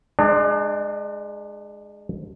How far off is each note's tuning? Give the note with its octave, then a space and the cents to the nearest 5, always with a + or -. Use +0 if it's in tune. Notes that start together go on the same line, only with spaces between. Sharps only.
G#3 +5 D4 +35 D5 +0